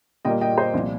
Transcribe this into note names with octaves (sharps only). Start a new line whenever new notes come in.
A#2 G3 A#3 D#5 G5
D#5 G5
C5 D#5
C2 A#2 F3